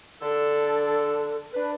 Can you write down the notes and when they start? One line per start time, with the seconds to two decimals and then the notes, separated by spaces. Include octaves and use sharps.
0.22 D3 D4 A4
1.54 D4 B4